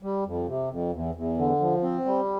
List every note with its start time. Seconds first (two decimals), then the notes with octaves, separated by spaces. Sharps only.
0.03 G3
0.25 F2
0.48 C3
0.70 F2
0.93 E2
1.15 E2
1.37 D3
1.60 F3
1.83 C4
2.05 G3